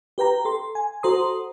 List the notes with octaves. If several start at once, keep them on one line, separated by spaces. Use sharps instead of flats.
G4 B4 G5 A#5
A4 C6
G#5
F#4 A4 C5 A#5 C6 D#6